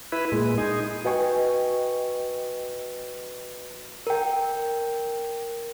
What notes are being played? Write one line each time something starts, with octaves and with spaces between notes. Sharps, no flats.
E4 B4
A#2 G#3
D#4 G#4
F#4 B4 D#5 G5 G#5 C#6
A#4 G5